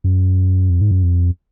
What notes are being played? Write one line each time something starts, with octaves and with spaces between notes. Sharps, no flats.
F#2
F2
G#2
F#2
F2